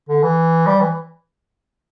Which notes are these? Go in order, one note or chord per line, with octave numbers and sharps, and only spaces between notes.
D3
E3
G3
E3